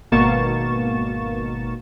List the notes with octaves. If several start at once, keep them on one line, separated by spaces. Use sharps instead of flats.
G#1 B2 A#3 C#6 A6 E7